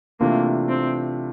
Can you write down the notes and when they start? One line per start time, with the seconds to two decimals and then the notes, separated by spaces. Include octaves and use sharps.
0.20 C3 E3 A3 A#3 D4 F4
0.69 C4